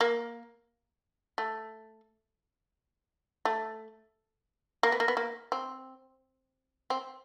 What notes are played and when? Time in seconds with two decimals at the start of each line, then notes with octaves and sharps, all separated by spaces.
0.01 A#3
1.38 A3
3.45 A3
4.83 A#3
4.92 B3
5.00 A#3
5.08 B3
5.17 A#3
5.52 C4
6.90 C4